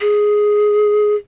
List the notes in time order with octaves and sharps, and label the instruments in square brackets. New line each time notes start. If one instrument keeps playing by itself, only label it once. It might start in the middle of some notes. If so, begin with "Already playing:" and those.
[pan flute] G#4